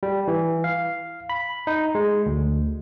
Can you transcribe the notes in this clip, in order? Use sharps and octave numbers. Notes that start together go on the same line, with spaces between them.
G3
E3
F5
B5
D#4
G#3
D2